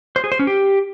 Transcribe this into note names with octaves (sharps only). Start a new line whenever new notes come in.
C5
G#4
C5
C#4
G4